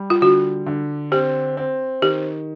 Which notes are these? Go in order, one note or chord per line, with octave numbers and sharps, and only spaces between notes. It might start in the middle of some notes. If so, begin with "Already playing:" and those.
Already playing: G3
F4
D3 F#4
D3
C4 G4
C4
D#3 G4